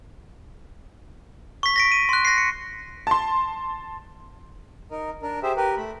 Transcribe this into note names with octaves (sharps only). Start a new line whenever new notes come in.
C#6 B6
A#6 B6 D7
D#7
C6 F#6
A#6 C7
C#7
A5 C6
D#4 A#4
D4 A#4
G4 G#4 C5 E5
G4 A#4 B4
A3 B5